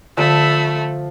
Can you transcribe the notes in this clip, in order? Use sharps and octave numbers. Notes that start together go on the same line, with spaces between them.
D3 F3 A3 B5 E6